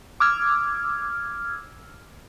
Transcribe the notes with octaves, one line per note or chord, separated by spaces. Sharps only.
D6 E6 F6 G#6